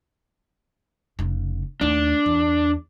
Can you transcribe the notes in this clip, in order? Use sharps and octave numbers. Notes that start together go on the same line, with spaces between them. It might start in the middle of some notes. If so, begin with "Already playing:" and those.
F1 C#3
D#2 A3 D4
E2